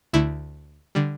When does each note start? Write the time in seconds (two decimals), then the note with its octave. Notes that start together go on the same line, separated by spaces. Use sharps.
0.13 D2 D3 A3 E4
0.95 D3 G3